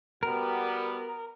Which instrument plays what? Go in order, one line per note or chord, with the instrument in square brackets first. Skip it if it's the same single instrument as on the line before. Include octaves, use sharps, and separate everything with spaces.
[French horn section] G3 B3 F#4 [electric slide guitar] A#4